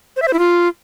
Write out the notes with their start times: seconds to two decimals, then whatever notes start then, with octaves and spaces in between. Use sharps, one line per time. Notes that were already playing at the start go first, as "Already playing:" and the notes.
0.17 C5
0.22 E5
0.28 C5
0.33 E4
0.39 F4